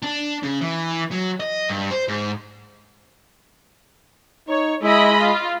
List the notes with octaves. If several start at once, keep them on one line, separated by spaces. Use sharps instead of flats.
D4
C#3
E3
F#3
D#5
G2
C5
G#2
D#4 C#5
G#3 E4 D#5 B5
F4